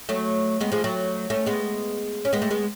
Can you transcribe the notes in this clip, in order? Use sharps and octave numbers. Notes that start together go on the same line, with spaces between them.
F#3 A3
G#3 B3
F3 G#3
F#3 A3
A3 C#4
G#3 B3
C#4
G#3 B3
A3
G#3 B3